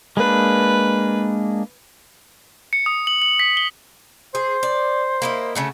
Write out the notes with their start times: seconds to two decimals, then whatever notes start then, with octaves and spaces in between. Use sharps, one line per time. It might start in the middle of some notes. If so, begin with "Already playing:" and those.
0.17 G#3 A#3 D4 B4
2.73 C#7
2.86 D#6
3.07 F#7
3.22 F#7
3.40 B6
3.57 G7
4.35 G#4 C5
4.63 D5
5.22 A#3 E4 D#5
5.55 C#3 A3 F#4